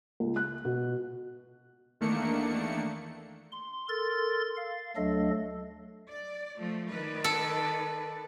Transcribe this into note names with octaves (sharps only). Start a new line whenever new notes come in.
C#2
F#6
B2
E2 D#3 A3 A#3 D4 C#7
C6
A4 A#4 C6 A6
F5
D2 F#3 A3 D4 A4 D#5
D5
F3 A3
D#3 B4 D5
A4